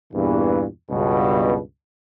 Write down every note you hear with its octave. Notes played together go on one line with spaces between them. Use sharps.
E2 G2 A#2 E3
C#2 G2 B2